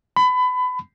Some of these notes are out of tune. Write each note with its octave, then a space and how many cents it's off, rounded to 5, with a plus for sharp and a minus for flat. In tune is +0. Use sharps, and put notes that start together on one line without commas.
B5 +25